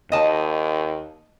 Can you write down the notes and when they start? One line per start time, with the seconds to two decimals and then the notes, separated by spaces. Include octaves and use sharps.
0.12 D#2 D#5 A5